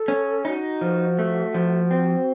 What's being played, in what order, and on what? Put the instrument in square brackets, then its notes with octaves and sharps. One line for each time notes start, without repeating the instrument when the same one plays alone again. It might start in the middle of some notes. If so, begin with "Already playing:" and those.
Already playing: [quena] A4
[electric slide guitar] C#4
[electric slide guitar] D#4 [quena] F#4
[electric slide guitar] F3
A3
F3
C4